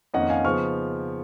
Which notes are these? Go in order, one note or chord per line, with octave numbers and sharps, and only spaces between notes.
F2 D#3 A#3 C#4 D#5 F#5
F5 G#5
C#3 F3 B3 D#4 C#6 F6